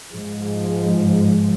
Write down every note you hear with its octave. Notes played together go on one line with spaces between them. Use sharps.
G#2 F3 G#3